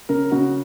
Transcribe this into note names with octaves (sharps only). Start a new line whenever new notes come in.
C#3 A#4
C#3 F#4